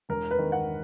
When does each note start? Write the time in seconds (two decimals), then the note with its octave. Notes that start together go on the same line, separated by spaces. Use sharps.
0.09 E1 A#4
0.31 B4
0.39 D#3
0.52 F#5